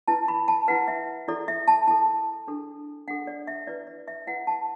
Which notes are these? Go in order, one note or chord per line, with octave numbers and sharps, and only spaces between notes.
E4 B4 A5
B5
A5
E4 B4 F#5
E5
E4 A4 D5
E5
A5
E4 A4 A5
D4 A4
D4 A4 F#5
D5
E5
E4 B4 D5
D5
E5
E4 B4 F#5
A5